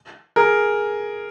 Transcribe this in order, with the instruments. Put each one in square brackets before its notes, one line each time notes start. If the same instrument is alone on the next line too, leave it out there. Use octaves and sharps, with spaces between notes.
[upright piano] G#4 A#4